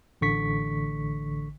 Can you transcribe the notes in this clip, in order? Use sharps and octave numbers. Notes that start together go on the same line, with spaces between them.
A1 D3 C#6 B6